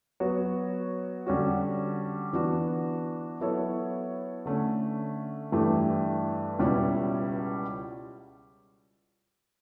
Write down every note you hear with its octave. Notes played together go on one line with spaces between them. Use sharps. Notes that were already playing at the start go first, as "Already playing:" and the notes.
F#3 B3 F#4 C#5
D3 G3 C#4 F#4
E3 B3 D4 F#4
F#3 B3 E4 A4 C#5
D3 A3 C#4
G2 E3 A3 E4 G4
C#2 B2 G3 C#4 E4